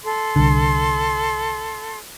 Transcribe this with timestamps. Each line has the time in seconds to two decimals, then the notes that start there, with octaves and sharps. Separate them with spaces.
0.04 A4 C6
0.36 C2 D3